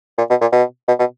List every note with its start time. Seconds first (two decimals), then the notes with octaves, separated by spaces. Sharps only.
0.18 A#2
0.30 B2
0.41 A#2
0.52 B2
0.88 B2
0.99 B2